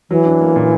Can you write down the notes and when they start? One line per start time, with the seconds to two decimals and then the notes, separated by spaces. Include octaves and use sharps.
0.10 E3 F#3
0.26 D4
0.41 A#3
0.56 A#2